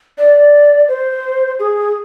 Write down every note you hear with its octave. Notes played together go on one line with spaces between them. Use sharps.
D5
C5
G#4